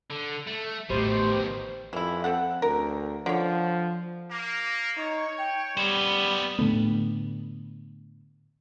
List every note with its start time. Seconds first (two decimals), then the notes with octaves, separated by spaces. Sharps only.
0.10 D3
0.47 A3
0.90 A1 B2 D#3 A3 G4 C5
1.93 F2 E3 E4
2.24 C4 A4 F#5
2.62 D2 A#4
3.26 D3 F3 C#5
4.31 A#3
4.97 D#4 C#5
5.39 G5
5.77 G3 B3 C5
6.59 A2 D3 A3 B3